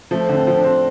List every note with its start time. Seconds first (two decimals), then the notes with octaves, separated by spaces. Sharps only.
0.11 F3 A3
0.29 D3
0.35 C4
0.47 F3
0.58 D4
0.64 C4